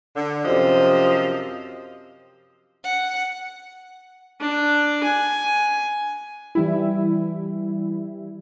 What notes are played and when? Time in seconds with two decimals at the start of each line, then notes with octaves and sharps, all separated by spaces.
0.16 D3
0.45 F#2 C3 F3 C4 D#5
2.84 F#5
4.41 D4
5.04 G#5
6.55 E3 G3 E4